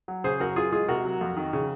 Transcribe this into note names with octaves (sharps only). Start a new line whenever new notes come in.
F#3
C#3 G#4 C5
F#2 F#4 A#4
F#2 F4 G#4
G#3 F4 G#4
C3 F#4 A#4
F#3
F2
D#3
C#3